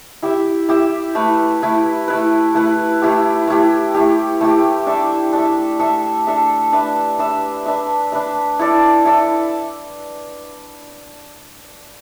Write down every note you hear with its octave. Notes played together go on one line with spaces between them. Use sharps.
E4 G4 E5
E4 G4 E5
A3 E4 B4
A3 E4 B4
A3 E4 B4
A3 E4 B4
A3 E4 G4
A3 E4 G4
A3 E4 G4
A3 E4 G4
D4 A4 E5
D4 A4 E5
D4 A4 E5
D4 A4 E5
D4 B4 E5
D4 B4 E5
D4 B4 E5
D4 B4 E5
E4 A4 D5
E4 A4 D5